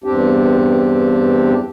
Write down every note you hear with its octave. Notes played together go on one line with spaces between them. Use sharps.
E2 G2 C4 D4 G4